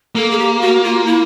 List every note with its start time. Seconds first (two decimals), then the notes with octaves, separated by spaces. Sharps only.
0.15 A#3 A4
0.30 G#4
0.39 G4
0.61 F#4
0.83 F4
1.06 E4